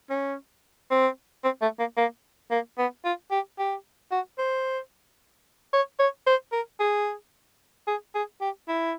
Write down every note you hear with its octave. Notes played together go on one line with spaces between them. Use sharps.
C#4
C4
C4
A3
A#3
A#3
A#3
B3
F4
G4
G4
F#4
C5
C#5
C#5
C5
A#4
G#4
G#4
G#4
G4
E4